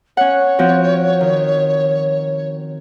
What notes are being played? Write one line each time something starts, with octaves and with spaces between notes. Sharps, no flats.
C#4 C#5 F#5
F3 C4 F#4
D#3